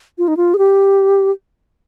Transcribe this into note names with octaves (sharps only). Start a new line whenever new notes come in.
F4
D#4
F4
G#4
G4